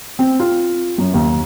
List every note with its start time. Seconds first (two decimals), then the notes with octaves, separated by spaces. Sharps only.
0.19 C4
0.40 F4
0.98 F#2
1.14 D#2